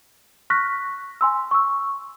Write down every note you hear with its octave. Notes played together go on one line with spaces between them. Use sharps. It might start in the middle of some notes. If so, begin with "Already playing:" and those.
C#6 F6 F#6 A#6 B6
G#5 C6 E6
C#6 E6